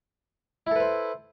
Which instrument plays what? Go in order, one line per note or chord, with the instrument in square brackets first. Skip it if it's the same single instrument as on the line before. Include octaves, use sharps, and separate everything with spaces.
[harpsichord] E4
A4
B4
C5